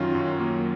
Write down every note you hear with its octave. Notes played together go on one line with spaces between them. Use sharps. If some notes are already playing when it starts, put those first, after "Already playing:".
Already playing: F#2 D#3 F#3 C#4 F4 F#4
F#2
F#3 A#3